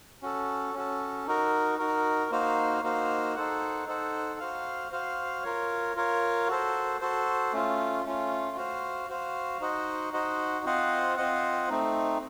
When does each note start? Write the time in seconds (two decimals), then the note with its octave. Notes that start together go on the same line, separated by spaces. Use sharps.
0.22 C#4 F#4 A4
0.74 C#4 F#4 A4
1.27 D#4 F#4 A#4
1.79 D#4 F#4 A#4
2.31 A#3 D#4 F#4 C5 F5
2.83 A#3 D#4 F#4 C5 F5
3.35 D#4 A4 C5 F#5
3.87 D#4 A4 C5 F#5
4.40 F#4 C5 F5
4.92 F#4 C5 F5
5.43 F4 A#4 C#5
5.96 F4 A#4 C#5
6.48 F#4 A4 C5
7.01 F#4 A4 C5
7.53 A3 C#4 F4
8.05 A3 C#4 F4
8.56 F#4 C5 F5
9.09 F#4 C5 F5
9.61 D#4 F#4 C5 D#5 F#5
10.13 D#4 F#4 C5 D#5 F#5
10.65 C4 F4 C5 D#5 F#5
11.17 C4 F4 C5 D#5 F#5
11.69 A3 C4 D#4